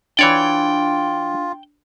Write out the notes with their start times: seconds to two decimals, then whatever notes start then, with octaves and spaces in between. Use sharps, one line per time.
0.19 E3 D4 F4 C#5 D5 G5